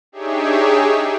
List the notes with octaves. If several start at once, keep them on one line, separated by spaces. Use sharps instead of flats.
D4 D#4 G4 G#4 C#5 E5